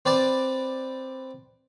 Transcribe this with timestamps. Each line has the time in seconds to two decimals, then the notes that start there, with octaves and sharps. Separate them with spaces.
0.06 C4 B4 D5 A5